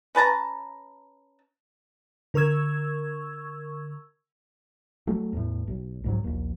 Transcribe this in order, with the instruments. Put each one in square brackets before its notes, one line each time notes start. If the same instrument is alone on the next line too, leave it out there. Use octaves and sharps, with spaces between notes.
[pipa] C#4 B4 A5 A#5
[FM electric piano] D3 A#4 C#6 E6 G#6
[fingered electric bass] F#3 A3
E2 A2
B1
C2 G#2 F#3
A#1 D#2